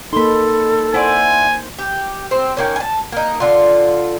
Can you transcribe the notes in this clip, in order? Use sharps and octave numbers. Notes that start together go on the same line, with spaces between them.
A#3 D#4 A4 B5 C6
E4 F#4 C5 D5 G#5
G4
C4
D#3 A#3 C#4
G#5 A5
A#3 D#4
D3 F4